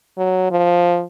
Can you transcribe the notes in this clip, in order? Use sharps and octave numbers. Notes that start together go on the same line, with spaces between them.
F#3
F3